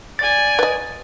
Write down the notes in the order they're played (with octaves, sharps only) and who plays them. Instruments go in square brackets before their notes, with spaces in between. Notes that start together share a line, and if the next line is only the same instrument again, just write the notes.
[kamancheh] D5 G#5 [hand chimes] A6
[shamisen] B4 D#5